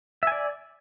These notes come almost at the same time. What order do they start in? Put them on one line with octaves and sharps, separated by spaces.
E5 G#5 D5